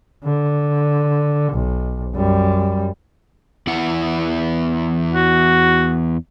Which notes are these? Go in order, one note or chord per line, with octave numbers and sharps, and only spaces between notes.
D3
B1
F#2 G3
E2 E4 F#5
F#4